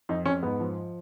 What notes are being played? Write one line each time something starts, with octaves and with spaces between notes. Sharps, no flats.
F2 D#4
F2 C#4
G#2 B3
F3